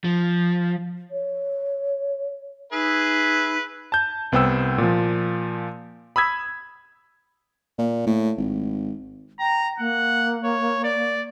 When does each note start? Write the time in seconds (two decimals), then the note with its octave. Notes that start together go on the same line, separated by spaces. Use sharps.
0.04 F3
1.11 C#5
2.72 D#4 G#4 B4 E5
3.92 A5 G6
4.32 C2 B3 C5 G5 E6
4.78 A#2 F3
6.16 B5 D#6 E6 G#6 B6
7.79 A#2
8.07 A2
8.38 G#1
9.39 G5 A#5
9.79 A#3 F#5
10.44 C#5
10.83 D5